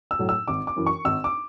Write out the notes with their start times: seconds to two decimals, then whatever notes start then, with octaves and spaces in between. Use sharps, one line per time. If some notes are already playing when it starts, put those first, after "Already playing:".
0.11 E6
0.19 A2 F#3
0.29 E6
0.48 G#1 D6
0.67 D6
0.76 F#2 E3
0.86 C#6
1.05 G#1 E6
1.24 D6